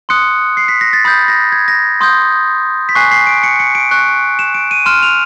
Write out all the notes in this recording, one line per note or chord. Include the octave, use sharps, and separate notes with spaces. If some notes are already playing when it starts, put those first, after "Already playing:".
C6 D#6 F#6 C#7
C7
B6
A#6
A6
B5 D#6 G6
A#6
G#6
A#6
C6 D#6 G6
B6
G#5 C#6 F#6 C7
C7
D7
C#7
C#7
D7
C#6 F#6
E7
D7
D#7
C6 F6 E7
F7